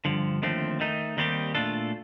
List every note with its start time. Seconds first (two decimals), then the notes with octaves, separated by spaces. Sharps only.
0.05 G2 D3 F3
0.42 D#2 D3 F3 A3 C4
0.80 D#3 A3 D#4
1.17 D#2 D#3 G3 C4 G4
1.55 A#2 A3 D4 F4 A4